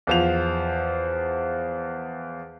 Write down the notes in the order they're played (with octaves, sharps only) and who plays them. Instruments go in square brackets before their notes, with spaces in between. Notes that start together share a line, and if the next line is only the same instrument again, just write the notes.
[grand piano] E2 F3 F7